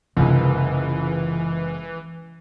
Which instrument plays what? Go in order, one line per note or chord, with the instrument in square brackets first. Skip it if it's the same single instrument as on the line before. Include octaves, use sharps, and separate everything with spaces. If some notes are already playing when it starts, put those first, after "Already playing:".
[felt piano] F#1 C#2 [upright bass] C3 D#4 [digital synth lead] E3